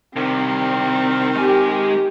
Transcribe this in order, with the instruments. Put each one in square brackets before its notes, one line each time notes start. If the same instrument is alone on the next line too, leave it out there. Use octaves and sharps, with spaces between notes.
[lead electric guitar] C2 C3 [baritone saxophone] D#3 [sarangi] C4
[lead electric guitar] G#3 G#5 [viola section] G4